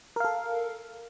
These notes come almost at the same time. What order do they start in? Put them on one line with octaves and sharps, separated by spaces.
A#4 F5 A4